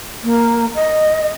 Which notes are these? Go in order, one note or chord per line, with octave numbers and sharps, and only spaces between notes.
A#3
D#5